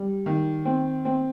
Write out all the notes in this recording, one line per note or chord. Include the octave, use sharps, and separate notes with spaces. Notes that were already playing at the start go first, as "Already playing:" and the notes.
Already playing: G3
D#3
C4
C4